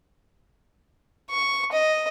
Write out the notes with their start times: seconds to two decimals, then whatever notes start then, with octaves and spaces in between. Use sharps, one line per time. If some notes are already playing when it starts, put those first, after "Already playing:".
1.30 C#6
1.72 D#5